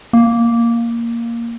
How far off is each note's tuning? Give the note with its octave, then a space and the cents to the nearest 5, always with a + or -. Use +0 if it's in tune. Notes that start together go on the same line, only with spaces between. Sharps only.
A#3 +0